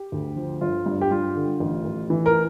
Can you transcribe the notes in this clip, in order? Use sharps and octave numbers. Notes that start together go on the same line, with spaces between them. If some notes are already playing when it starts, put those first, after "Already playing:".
Already playing: G4
D2
F3
G1 F4
G2
G4
G2 F4
D3
A1
A1
E3
A#4